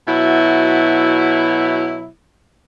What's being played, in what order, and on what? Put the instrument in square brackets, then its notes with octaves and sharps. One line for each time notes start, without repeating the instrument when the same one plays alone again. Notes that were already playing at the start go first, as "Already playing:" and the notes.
[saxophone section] B2 F#3 E4